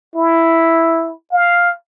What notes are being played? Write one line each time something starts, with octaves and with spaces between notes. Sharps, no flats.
E4
F5